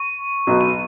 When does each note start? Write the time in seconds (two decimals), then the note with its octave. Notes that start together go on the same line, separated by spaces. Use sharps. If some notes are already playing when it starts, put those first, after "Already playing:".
Already playing: C#6
0.47 B1 B2 F#3
0.61 D#7